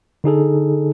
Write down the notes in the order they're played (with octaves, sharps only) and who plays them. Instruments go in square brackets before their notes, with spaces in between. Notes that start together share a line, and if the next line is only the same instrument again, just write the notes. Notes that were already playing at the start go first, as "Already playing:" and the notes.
[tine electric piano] D3 D#4 G#4 A4